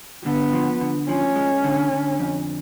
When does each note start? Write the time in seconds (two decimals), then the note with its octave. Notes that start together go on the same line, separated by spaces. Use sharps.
0.25 D3 B3
0.53 F3
0.81 D3
1.09 F3 C#4
1.36 G#3
1.64 D3
1.92 D3
2.20 F2